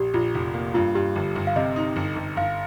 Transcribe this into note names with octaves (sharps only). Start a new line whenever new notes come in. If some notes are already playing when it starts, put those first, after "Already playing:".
Already playing: A#1 G4
A#1 F4
F1
A#3
G2 F4
G2 G4
G1
G1
F5
C3 D#5
D#4
G1
G1
G1 F5